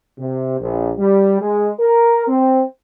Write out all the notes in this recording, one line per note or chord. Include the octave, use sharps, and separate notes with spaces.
C3
A#1
G3
G#3
A#4
C4